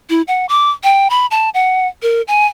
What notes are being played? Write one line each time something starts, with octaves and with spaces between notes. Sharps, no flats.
E4
F#5
D6
G5
B5
A5
F#5
A#4
G#5